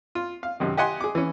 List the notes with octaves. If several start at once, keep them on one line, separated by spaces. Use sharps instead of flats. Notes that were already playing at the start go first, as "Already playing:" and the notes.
F4
F5
F#2 C3 D#3
G4 D#5 F#5 G#5 C6
G#4 D6
E3 C#4